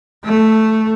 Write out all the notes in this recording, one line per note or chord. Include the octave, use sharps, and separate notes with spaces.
A3